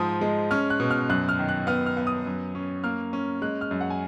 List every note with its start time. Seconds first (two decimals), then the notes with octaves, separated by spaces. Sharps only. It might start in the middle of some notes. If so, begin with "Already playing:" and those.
Already playing: G#2 F3 D#6
0.21 G#3
0.51 C#4 F6
0.70 F#6
0.80 B2
0.91 F6
1.09 F#2 F#6
1.29 F6
1.39 D#3
1.49 F#6
1.67 B3 F6
1.86 F6
1.97 B3
2.07 D#6
2.26 F#2
2.55 C#4
2.84 A#3 F6
3.13 C#4
3.42 G#3 F#6
3.61 F6
3.71 F#2
3.81 F#5
3.90 G#5